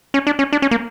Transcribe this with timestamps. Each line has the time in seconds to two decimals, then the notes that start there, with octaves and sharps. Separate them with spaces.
0.14 C#4
0.27 D4
0.39 C#4
0.53 D4
0.62 C#4
0.71 A#3